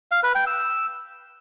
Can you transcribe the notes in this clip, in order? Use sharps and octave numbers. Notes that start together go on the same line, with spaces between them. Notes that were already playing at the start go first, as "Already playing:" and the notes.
F5
B4
G5
E6